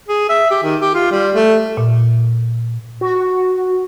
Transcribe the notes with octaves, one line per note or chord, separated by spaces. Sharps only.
G#4
E5
G4
D#3
G4
F4
G3
A3
A#2
F#4